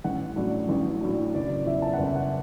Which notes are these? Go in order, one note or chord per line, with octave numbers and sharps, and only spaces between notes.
A1 F#5
A2 F#3 D4
A1
A2 F#3 D4
F#1 D5
D5
E2 E3 E5
A5
F#1 F#5
E5
F#5